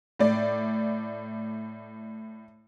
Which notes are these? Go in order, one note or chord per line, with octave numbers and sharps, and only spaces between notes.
A2 D5